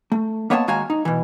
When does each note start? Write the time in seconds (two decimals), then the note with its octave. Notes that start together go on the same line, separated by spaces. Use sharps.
0.12 A3
0.50 A#3 B3 C#5 D#5 F5 A5
0.68 D#2 G#3 F#4 F5 G#5 A#5
0.90 D#4
1.05 B2 E3